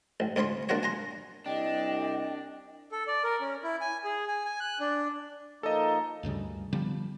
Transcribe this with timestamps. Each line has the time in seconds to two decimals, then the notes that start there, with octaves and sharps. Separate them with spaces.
0.20 A1
0.36 D2 C#4 C#5 B5 C6
0.69 A#3 D4 F4 F#4 C#5
0.83 G#5 A#5 C6
1.46 C2 D4 D#5 G5
2.92 A4
3.07 D5
3.24 A#4
3.40 C#4
3.64 E4
3.81 G#5
4.04 G#4
4.28 G#5
4.45 G#5
4.60 F#6
4.80 D4
5.63 F3 A#3 D#4 A4 D#5
6.23 D2 G2 C#3 G3
6.73 D3 F3 G3 B3